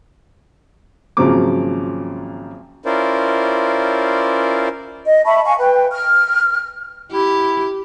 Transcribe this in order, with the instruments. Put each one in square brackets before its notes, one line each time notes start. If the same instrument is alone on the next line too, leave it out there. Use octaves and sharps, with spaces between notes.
[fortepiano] G#1 C#3 F3 F#3 A#3 D6
[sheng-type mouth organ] C#4 E4 F4 A#4 C5 D5
[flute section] D#5
E5 A5 B5 C#6
F5 G#5 C#6
B4 G5
F6
[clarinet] E4 [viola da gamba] G4